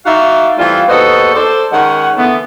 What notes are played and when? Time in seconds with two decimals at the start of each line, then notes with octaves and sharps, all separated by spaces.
0.05 D#4 F#4 D5 E5 F5
0.58 E3 G3 A3 C4 F4
0.89 D#2 B3 F#4 A4 C5 D#5
1.34 A4 C5 D5
1.71 D#3 G#3 C#4 F#5
2.17 D3 E3 A3 B3